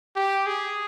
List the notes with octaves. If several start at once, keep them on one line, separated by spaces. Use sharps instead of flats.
G4
G#4